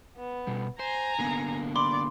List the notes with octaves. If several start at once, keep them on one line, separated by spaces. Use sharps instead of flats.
B3
B2 G3
C5 G#5 A#5
D3 A#3 B3
D5 B5 C6 D6